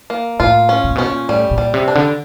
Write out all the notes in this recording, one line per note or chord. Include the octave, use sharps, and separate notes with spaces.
A#3
A2 F4
C#4
A#2
B2 C#4
A#2
A2 G3
A#2
G3
C3
D4
D3